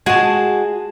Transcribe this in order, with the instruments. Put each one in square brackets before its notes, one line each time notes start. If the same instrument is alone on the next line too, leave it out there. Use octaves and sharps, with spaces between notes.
[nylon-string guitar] G#3 F#4 [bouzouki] G#4 A5